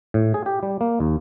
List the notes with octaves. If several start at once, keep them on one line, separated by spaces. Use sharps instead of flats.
A2
G#4
G4
G3
A#3
D#2